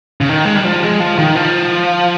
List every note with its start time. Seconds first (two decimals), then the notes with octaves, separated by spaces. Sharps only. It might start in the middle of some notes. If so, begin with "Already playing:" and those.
0.21 C#3
0.29 D#3
0.45 G#3
0.55 G3
0.65 F3
0.83 G#3
1.00 F3
1.19 D#3
1.35 F3